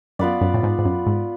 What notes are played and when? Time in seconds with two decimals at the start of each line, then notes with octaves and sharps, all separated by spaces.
0.19 F#2 B3 F4 B4 D5
0.41 F#2
0.54 A2
0.63 G#2
0.79 G#2
0.85 F#2
1.06 G#2